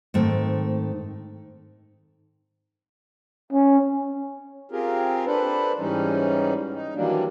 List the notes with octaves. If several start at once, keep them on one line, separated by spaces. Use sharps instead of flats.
G#2 D#3 A3 C4
C#4
C4 F4 G4 G#4 A#4
D4 A4 B4 C5
G#2 E3 G3 C#4 D#4
D#4
D#3 E3 F#3 G3 A#3 D4